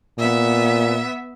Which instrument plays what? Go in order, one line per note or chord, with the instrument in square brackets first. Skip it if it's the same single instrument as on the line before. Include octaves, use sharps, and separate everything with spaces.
[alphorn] A#2 [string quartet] B3 E5